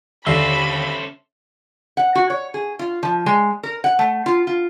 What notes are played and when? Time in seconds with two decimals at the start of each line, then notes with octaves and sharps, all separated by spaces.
0.26 D#2 D3 C#4 A4 C5 E5 B5 C7
1.97 F#5
2.15 F#4
2.30 C#5
2.54 G#4
2.79 F4
3.03 F3
3.26 G#3
3.63 A#4
3.84 F#5
3.99 A3
4.26 F4
4.47 F4